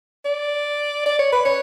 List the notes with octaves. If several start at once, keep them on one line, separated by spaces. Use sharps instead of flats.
D5
D5
C#5
B4
C#5